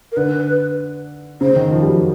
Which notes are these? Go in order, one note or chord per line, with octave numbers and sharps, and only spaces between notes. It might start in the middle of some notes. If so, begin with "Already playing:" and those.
A#4
D3 B4
C#3 C5
D#3
F3
G3
F#3